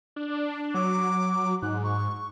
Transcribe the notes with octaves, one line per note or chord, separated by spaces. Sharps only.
D4
F#3 D6
G#2 F#6
C#6